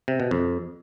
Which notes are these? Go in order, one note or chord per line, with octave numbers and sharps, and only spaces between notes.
C3
B2
F2